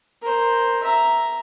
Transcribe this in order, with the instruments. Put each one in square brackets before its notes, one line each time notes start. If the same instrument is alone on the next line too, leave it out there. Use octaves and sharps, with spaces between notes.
[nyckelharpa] A#4 C5
E5 A#5